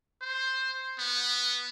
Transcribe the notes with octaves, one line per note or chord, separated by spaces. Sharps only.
C5
B3